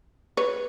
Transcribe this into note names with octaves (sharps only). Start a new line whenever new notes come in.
B4 C#5